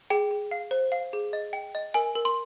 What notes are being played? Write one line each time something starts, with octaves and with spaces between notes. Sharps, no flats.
G#4 G5
G#4
F5
C5
F5
G#4
D#5
G5
D#5
A#4 G#5
A#4
C6